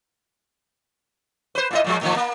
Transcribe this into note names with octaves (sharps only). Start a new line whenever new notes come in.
B4 C5
A#2 E4 D#5
A#2 F3 G#3
A2 D#3 F3
A#3